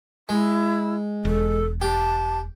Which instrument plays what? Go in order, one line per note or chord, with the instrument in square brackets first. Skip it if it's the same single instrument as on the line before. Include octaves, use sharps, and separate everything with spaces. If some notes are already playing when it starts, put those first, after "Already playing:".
[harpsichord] G#3 [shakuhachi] E4
[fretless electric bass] E1 [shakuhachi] A4
[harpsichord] G4 [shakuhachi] A5